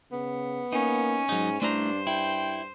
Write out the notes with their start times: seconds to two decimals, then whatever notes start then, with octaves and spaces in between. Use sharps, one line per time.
0.12 C#3 B3
0.73 A#3 C#4 D#4
1.29 G#2 F#3 D#4
1.62 G2 A3 D4 E4 C5 A#5
2.07 E4 G5